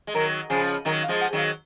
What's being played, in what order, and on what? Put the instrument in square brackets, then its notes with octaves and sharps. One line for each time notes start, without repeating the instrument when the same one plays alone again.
[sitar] G#3
[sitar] D#3 F#3 [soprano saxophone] A#4
[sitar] C#3 F3 [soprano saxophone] G#4
[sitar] D#3 F#3 [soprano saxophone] A#4
[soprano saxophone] F5
[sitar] F3 G#3
[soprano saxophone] F#5
[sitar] D#3 F#3
[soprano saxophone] F5